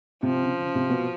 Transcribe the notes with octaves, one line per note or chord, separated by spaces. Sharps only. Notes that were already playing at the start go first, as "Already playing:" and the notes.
C3 F3
C#3
C#3
C3
B2